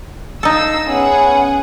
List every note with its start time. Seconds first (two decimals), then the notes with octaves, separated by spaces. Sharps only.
0.43 D#4 A4 F5 E6
0.87 B3 C#4 G#4 F#5